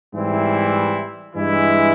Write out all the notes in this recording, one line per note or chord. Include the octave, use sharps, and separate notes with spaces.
G#2 E3 G3 C4 E4
G2 E3 G#3 E4